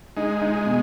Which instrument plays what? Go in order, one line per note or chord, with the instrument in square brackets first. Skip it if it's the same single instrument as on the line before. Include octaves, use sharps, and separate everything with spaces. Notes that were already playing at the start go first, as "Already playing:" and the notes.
[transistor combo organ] G#3 [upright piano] D#4
[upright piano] D#4
B2